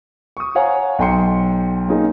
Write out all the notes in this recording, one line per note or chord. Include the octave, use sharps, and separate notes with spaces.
C#6 D#6
C5 C#5 F5 F#5 G#5 A#5
B1 G5 C6 C#7
A#3 C#4 D#4 G#4